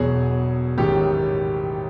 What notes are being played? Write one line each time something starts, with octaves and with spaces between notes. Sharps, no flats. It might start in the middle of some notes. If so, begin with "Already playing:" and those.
Already playing: E1 E2 B2 F#3 G#4
A1 G#2 D#3 F#3 G4